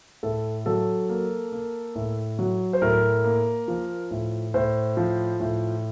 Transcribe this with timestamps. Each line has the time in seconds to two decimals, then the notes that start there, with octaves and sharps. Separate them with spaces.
0.23 A2 A4
0.66 F#3 A4
1.09 A#3
1.52 A#3
1.95 A2
2.39 F#3
2.73 C5
2.82 A2 A#4
3.24 A#3
3.68 F3
4.11 A2
4.54 A2 C5
4.97 F3
5.40 A2